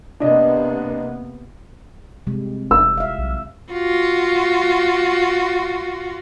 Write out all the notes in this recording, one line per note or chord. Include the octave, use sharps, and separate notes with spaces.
C3 A#3 B3 D4 D#5
C3 G3 G#3
F1 E6
E5 F5
B1
F4 F#4